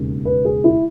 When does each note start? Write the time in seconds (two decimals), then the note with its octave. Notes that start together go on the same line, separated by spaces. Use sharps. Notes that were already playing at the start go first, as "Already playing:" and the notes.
Already playing: E1 D#2 C#3
0.25 B4
0.45 G#4
0.64 E4